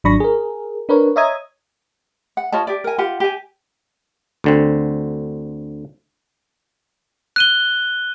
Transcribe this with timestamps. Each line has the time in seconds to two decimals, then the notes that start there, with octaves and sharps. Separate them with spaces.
0.04 G#1 F#3 D4 B5 C#6 A#6
0.20 G#4 A#4
0.89 D4 A#4 B4 C#5
1.16 C#5 D#5 E5 A#5 D#6 G#6
2.37 F#5
2.52 F4 C#5 D#5 A5
2.67 G4 D5
2.84 A#4 G#5
2.98 F4 G4 F#5
3.20 G4 G#5
4.44 D2 D3 C4
7.36 F#6 D#7 G7